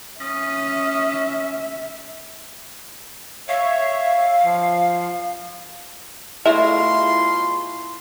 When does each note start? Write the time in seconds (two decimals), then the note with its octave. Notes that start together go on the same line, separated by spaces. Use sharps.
0.21 C#4 E5 D#6
3.48 C#5 E5 F5
4.44 F3
6.46 B2 A3 E4 F4 G#4 D#5 E5 C6